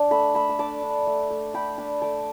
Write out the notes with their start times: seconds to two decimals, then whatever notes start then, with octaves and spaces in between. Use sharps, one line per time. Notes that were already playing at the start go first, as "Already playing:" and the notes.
Already playing: D4 D6
0.11 A3 B5 E6
0.35 A3 B5 E6
0.49 E6
0.59 D4 A5 D6
0.83 D4
1.07 A3
1.30 A3
1.54 A3 G5 B5
1.78 D4 A5 D6
2.02 A3 A5 D6